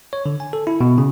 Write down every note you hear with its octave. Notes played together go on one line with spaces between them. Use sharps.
C#5
D3
G#5
A4
E4
B2
C#3